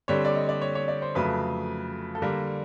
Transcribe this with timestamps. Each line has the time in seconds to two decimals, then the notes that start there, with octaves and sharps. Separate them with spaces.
0.08 D3 G3 C4 C#5
0.25 D5
0.35 D#5
0.49 D5
0.62 C#5
0.75 C#5
0.88 D5
1.02 C5
1.15 F2 C#3 F#3 A3 B4
2.15 A4
2.22 D3 G3 A#3 A#4